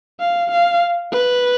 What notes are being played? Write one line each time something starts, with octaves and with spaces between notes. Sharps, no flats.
F5
F5
B4